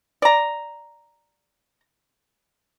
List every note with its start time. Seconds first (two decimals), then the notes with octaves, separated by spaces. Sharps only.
0.22 D5 A#5